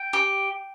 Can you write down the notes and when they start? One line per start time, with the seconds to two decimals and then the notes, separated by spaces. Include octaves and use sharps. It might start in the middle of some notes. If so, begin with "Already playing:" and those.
Already playing: G5
0.13 G4